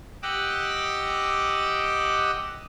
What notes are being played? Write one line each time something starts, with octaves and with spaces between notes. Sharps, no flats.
G4 D#5 F#5 D6 E6 F#6